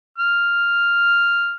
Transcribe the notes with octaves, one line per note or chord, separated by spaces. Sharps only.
F6